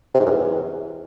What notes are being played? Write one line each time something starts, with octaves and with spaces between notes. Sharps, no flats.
C3
G#2
F#2
E2